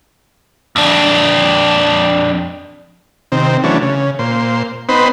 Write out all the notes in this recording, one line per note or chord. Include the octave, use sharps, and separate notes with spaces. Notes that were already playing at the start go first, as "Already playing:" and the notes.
F2 D4
C3 D#3 C4
E3 F#3 A3 C#4 D4
C#3
A#2 C5
B3 C4 D#4 B4 C5